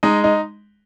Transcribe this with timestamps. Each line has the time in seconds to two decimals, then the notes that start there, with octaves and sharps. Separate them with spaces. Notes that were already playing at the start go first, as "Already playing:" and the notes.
0.03 G#3 D#4
0.24 D#4